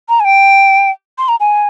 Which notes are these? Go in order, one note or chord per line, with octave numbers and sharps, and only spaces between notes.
A#5
G#5
G5
C6
A#5
G#5